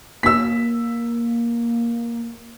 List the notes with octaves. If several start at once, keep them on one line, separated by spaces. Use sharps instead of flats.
A#3 E6 B6